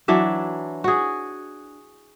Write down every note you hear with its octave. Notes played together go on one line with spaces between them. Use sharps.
E3 F#3 D4 E5
F#4 G#4